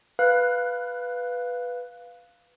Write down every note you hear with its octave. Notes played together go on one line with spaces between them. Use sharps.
B4 F5 F#6